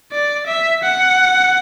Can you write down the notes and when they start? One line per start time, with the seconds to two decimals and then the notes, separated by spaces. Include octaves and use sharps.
0.12 D5
0.47 E5
0.83 F#5